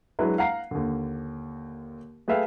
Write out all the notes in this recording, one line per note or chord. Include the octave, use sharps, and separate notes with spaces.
F#3 G#3 D4 E4 B4
F5 F#5 A#5 C7
D#2 D3
A3 G#4 B4 E5 F5 G5